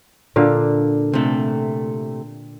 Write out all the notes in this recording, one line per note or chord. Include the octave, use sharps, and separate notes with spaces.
A#2 D3 F5
C3 A3